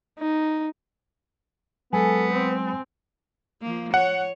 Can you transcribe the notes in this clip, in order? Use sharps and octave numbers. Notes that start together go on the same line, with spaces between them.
D#4
F#3 G#3 B3 A4 G#5
C4
F3 A#3
C#5 F#5